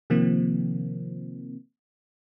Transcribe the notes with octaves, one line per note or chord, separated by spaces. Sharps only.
C3 D#3 F3 A#3 C4